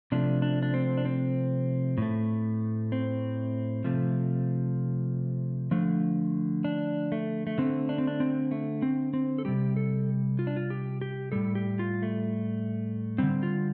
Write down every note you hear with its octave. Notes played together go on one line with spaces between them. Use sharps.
C3 F3 A3 D4
D4
D4
C4
D4
C4
A2 A3
C4
C3 F3 A3
D3 F3 A3
D4
A3
A3
D3 A3 C4
D4
C4
D4
C4
A3
C4
C4
A4
C3 G3 G4
A4
F4
D4
F4
G4
G4
A2 G3 A4
G4
F4
A3
D3 G3 C4
F4